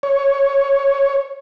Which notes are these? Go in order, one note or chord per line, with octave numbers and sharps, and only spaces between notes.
C#5